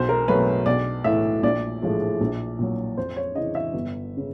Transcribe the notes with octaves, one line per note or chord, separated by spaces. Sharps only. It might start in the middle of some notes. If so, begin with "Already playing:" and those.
Already playing: B1 C5
A#4
B2 F#3 A3 B4
B1 D5
A2 E3 E5
A#1 D5
A2 F3 G#3
A#1
A#2 F#3
F2 C5
C#5
C#3 E3 D#5
E5
G1
C#3